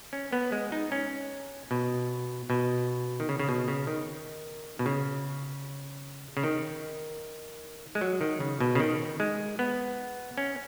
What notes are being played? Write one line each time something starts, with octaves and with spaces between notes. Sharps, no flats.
C#4
B3
G#3
D#4
C#4
B2
B2
D#3
C#3
C#3
B2
C#3
D#3
B2
C#3
C#3
D#3
G#3
F#3
D#3
C#3
B2
C#3
D#3
G#3
B3
C#4